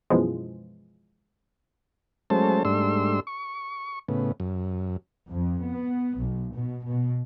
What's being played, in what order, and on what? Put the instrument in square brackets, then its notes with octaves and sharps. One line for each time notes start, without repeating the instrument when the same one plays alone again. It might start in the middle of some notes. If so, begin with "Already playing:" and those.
[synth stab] F#2 B2 E3 F3 G#3
[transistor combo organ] F#3 G#3 A3 C#4 C5 A5
G#2 G3 A3 D4 C6 E6
C#6
A2 C#3 B3
F#2
[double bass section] F2
B3
B1
B2
B2